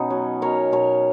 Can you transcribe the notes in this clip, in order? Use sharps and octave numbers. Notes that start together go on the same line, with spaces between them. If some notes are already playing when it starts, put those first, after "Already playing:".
Already playing: B2 B3 C#4 D#4
F#3
B2 A#4 C#5
B2 A#4 C#5